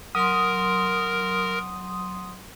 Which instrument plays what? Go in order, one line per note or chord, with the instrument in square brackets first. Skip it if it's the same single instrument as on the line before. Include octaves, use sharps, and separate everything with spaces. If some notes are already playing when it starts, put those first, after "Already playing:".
[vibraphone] F#3 C6 [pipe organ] A#4 [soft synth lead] D#6